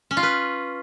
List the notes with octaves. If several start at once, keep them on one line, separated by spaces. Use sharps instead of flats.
C#4
F4
B4